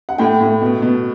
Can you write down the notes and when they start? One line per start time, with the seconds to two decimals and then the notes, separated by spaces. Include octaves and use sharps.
0.09 F#5
0.18 A2 G5
0.41 A2
0.62 B2
0.82 B2